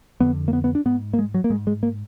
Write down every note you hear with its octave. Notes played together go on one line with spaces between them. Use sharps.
F2 D3 B3
A#3
B3
B3
D4
G#2 B3
A#3
G#3
F#3
A#3
G#2 G#3
G#3
A#3